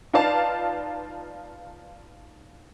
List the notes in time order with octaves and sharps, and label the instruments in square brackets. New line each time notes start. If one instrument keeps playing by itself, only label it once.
[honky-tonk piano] D#4 F4 B4 D5 F5 A5